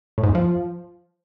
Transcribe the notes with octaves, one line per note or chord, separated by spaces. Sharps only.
A2
G#2
E2
F3